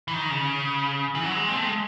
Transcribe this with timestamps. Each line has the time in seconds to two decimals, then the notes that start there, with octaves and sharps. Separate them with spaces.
0.08 E3
0.14 D#3
0.31 C#3
1.15 E3
1.25 F#3
1.32 G#3
1.48 C4
1.56 A3
1.65 G#3